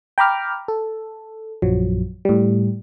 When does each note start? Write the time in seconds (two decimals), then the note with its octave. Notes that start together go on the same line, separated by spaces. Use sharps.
0.18 G5 A#5 B5 D6 F6
0.68 A4
1.62 A#1 F#2 F3 F#3
2.25 A2 G3